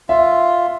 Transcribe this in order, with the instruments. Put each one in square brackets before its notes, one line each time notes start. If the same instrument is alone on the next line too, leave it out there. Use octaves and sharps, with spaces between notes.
[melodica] F4 [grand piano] E5